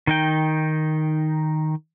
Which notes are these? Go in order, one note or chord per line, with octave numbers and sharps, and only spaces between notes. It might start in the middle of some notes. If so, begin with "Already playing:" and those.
D#3 D#4 G5